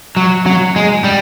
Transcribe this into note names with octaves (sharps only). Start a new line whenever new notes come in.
F#3
F#3
G#3
G3